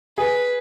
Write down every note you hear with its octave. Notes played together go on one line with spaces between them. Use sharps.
G#4 B4